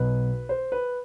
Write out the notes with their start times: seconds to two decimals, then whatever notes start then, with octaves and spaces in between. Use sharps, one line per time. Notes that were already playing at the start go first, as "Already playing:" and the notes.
Already playing: B1 B2 B4
0.49 C5
0.72 B4